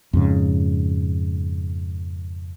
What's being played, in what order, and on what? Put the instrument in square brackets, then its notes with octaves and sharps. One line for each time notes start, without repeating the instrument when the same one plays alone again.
[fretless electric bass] F2 G#2 C#3